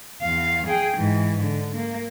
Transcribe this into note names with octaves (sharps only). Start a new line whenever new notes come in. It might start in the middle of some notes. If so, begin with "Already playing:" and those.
E2 F5
G#4 G5
G#2 E3
D3
A#3